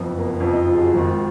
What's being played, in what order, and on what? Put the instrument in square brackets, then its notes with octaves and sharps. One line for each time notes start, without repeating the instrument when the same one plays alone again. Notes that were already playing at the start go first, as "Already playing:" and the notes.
Already playing: [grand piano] F#1 F2 F3 B3
A#3
B3
F#1 F2 F3 C#4
D#4
F4
G#4
F#4
G#1 G#2 D#3 F4